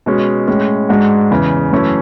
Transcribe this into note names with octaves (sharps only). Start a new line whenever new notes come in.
B2 G#3 C#4
A2 G#3 C#4
G#2 G#3 D4 F#4
E2 C#3 E3
F#2 E3 A3 C#4 E4